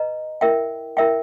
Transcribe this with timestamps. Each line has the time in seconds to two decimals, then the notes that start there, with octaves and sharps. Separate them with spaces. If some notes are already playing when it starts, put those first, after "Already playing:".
Already playing: B4 D#5 A#5
0.41 E4 A#4 E5 G5
0.97 E4 A#4 E5 G5